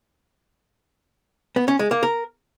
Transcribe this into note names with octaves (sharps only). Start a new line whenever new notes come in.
B3
C#4
G#3
A#3
A#4